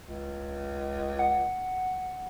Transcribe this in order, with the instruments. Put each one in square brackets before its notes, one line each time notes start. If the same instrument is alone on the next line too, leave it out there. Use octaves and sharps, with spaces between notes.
[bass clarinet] C#2
[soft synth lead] F#5